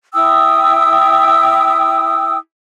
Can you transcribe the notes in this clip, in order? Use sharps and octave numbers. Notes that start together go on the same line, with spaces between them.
E4 G5 D#6 E6